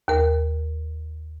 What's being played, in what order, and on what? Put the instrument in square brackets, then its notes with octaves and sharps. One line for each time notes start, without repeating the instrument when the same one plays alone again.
[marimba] D#2 A#4